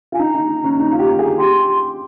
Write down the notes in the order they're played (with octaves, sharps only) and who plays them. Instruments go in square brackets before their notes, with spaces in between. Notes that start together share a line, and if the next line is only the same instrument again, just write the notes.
[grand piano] F4 [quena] G#5
[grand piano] D#4 [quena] A#5
[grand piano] D#4
C#4
D#4
F4
G4
G#4
[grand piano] G4 [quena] C6